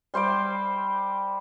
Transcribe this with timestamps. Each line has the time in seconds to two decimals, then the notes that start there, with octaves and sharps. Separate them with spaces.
0.14 G3 C5 G5 D6